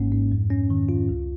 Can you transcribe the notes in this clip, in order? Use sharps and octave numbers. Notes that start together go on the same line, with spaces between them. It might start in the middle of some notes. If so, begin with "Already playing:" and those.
Already playing: G#1 G#2 A#3 C#4
G#2
F2
C#4
D#3
F4
C#2